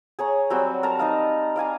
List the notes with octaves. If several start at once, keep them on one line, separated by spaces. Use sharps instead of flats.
G#4 C#5 A#5
F#3 G3 C4 F#4
A#4 A5 A#5
D#4 D#5 F5
D5 F5 G#5 A#5